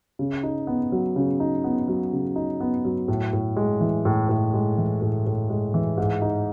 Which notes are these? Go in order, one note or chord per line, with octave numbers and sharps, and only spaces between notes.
C#3
D#4
B3
F#3
C#3
D#4
B3
F#3
C#3
D#4
B3
F#3
A2
A2
G#3
E3
A2
A2
G#3
E3
A2
A2
G#3
E3
G#2
D#4